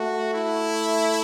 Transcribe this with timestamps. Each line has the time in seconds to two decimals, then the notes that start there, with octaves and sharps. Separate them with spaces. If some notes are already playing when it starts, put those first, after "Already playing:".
Already playing: A3 F#4
0.34 E4